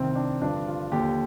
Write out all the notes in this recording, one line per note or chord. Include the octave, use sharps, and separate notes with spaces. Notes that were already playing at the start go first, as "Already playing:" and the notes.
Already playing: C2 C3 D#3 C4
D4
G2 D3 F3 D4
F4
D#2 D3 F3 G4